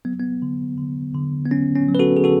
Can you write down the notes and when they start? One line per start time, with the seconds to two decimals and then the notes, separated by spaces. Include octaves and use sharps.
0.05 F#3 B3
0.19 B3
0.42 D3
0.78 D3
1.14 D3
1.45 B3
1.51 F#3 C#4
1.75 C#4
1.88 F#3
1.95 B4
1.99 F#4 A4
2.17 G#4
2.24 D3 F#4 A4